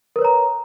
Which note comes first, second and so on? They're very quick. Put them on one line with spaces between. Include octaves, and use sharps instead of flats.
A#4 B4 C#5 A#5